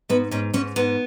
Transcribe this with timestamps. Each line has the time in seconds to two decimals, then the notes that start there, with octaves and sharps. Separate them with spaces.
0.09 G#2 B3
0.31 G#2 C#4
0.54 G#2 C#4
0.76 G#2 B3